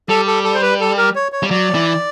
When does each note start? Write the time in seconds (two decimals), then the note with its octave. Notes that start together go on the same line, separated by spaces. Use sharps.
0.09 G3 A4
0.27 A4
0.44 A4
0.55 C5
0.62 B4
0.80 A4
0.97 A#4
1.15 C#5
1.32 C#5
1.43 G3
1.51 F#3 D5
1.75 E3